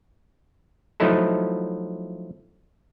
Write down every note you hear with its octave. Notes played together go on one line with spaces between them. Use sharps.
F3 F#3 A3 D#4 E4 A4